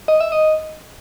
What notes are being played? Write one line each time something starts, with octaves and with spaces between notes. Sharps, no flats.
D#5
E5
D#5